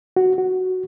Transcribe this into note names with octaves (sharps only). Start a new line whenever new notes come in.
F#4
F#4